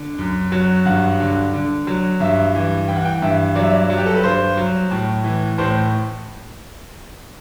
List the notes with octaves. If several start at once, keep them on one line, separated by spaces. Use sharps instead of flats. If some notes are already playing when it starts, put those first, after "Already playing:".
Already playing: D3
F#2
F#3
G2 F#5
D3
D3
F#3
G2 E5
E3
E3 G5
F#5
G5
G2 E5
F#3 D5
E5
D5
F#3
G4
A4
B4
G2 C5
F#3
A2
E3
A2 C5